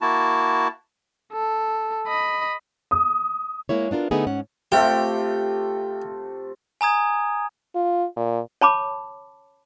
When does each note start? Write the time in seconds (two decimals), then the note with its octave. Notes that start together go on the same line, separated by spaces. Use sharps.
0.01 A#3 E4 F#4 A5
1.33 A4
2.08 D#5 B5
2.91 D#6
3.69 G#3 A#3 E4 C#5
3.91 B3 D4 F4 A#4
4.11 D3 A3 B3 D#4 G#4
4.27 G#2 C#4 F#5
4.72 C3 A3 F4 G4
6.81 G#5 A#5 D#6 G#6
7.75 F4
8.16 A#2
8.61 C#5 A5 B5 D6